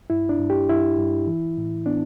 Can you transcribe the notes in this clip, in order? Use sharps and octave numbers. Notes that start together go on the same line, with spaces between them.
G2 E4
D4
G2
G4
G2 E4
G2
E3
A2
B3 D4